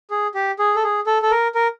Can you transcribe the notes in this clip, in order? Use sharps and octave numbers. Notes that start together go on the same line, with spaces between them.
G#4
G4
G#4
A4
G#4
A4
A4
A#4
A#4